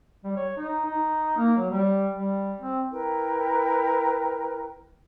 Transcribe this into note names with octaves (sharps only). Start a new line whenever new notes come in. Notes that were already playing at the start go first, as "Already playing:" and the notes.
G3
C#5
D#4
D#4
A#3
F#3
G3
G3
C4
E4 A#4 B4 G5